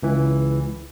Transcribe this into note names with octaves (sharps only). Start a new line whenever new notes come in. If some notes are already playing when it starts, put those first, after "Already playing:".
C#2 E3